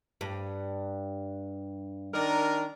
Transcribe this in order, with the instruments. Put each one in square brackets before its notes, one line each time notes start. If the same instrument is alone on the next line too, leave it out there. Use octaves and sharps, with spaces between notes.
[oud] G2
[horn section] D#3 D4 A#4